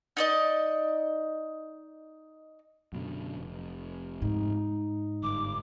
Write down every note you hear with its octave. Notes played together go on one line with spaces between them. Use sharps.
D#4 D5 D#5
F#2 B2 D3
F1
G#2 D#4
G1 D6